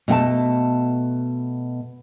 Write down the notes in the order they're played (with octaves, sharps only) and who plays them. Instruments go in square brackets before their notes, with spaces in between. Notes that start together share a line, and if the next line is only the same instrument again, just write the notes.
[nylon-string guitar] B2 A3 G5 A5